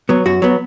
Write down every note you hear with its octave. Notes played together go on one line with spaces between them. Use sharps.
F#3 B3
F#2 F#4
F#3 B3